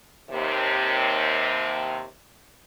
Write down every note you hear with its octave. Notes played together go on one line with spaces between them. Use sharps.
D#2 C3